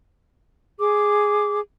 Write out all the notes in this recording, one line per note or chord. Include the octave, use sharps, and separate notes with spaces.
G#4 D6